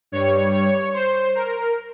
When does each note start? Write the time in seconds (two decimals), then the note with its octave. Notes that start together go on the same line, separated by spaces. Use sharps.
0.12 G2 G3 C#5
0.53 C#5
0.94 C5
1.35 A#4